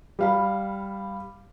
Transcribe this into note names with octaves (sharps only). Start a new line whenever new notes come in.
G3 F5 B5